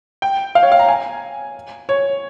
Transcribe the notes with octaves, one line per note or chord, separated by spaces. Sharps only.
G5
F5
C#5
F5
A#5
G#5
C#5